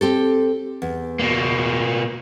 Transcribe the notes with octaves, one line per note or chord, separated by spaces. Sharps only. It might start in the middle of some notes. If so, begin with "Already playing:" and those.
C4 G4 A4
E2
B2 A#3